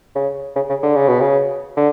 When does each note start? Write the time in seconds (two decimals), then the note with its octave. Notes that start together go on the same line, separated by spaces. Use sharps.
0.15 C#3
0.56 C#3
0.69 C#3
0.83 D3
0.96 C#3
1.08 B2
1.20 C#3
1.77 D3